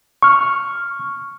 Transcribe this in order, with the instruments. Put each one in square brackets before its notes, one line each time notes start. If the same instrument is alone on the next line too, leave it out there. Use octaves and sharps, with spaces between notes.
[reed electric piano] C#6 F6